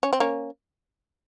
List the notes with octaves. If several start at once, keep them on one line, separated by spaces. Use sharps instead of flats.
C#4
C4
A#3 C#4